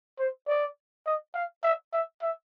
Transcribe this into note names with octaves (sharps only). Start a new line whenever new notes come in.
C5
D5
D#5
F5
E5
E5
E5